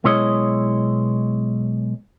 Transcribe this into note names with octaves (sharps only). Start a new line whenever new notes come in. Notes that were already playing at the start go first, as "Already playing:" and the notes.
B1 B2 G#3 E4 C#5 D#5